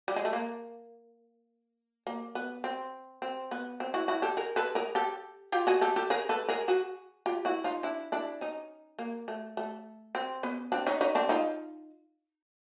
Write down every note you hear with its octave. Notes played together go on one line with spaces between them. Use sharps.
G3
G#3
A3
A#3
A#3
B3
C4
C4
B3
C4
E4 F#4
E4 F#4
G4 A4
G#4 A#4
A4 B4
G#4 A#4
G4 A4
F4 G4
F#4 G#4
G4 A4
G4 A4
G#4 A#4
A4 B4
G#4 A#4
F#4 G#4
F4 G4
E4 F#4
D#4 F4
D4 E4
D4 E4
C#4 D#4
A#3
A3
A3
C4
B3 C#4
C4 D4
C#4 D#4
C#4 D#4
C4 D4
D#4 F4